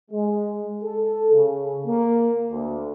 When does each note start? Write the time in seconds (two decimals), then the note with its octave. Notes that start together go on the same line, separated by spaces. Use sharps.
0.11 G#3
0.83 A4
1.33 C#3
1.86 A#3
2.51 D2